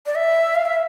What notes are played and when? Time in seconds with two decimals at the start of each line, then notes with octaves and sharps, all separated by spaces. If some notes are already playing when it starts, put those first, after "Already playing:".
0.06 D5
0.15 E5
0.55 F5
0.65 E5